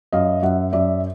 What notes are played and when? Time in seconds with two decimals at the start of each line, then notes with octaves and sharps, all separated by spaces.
0.12 F#2 D#5 F5
0.42 F#2 E5 F#5
0.73 F#2 D5 E5